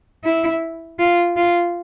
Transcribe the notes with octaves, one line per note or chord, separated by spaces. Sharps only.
E4
F4
F4